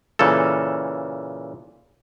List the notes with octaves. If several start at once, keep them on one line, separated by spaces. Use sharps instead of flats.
A#2 C#3 E3 A4